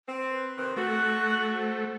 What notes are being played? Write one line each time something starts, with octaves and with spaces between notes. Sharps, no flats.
C4
B4
C3 D#3 C4
A3 F#4 F#6
C5